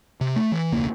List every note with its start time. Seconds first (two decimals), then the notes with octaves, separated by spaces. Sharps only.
0.21 C3
0.36 A3
0.52 E3
0.72 E1 C#2 A#3